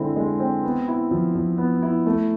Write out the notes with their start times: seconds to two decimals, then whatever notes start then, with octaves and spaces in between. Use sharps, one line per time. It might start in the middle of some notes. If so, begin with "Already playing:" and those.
Already playing: D3 G#3 C4 E4
0.16 G#3
0.40 C4
0.63 B3
0.88 E4
1.11 F3
1.35 F3
1.58 B3
1.82 E4
2.06 A3